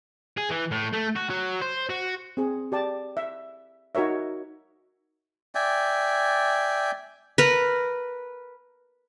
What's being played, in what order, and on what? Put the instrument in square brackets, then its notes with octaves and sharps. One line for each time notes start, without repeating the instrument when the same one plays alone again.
[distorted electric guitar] G#4
E3
A2
A3
F#4
F#3
C5
F#4
[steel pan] C4 G#4
G4 D5 A5
E5
D#4 F#4 A#4 C#5 E5
[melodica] D5 E5 G5 G#5
[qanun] A#4 B4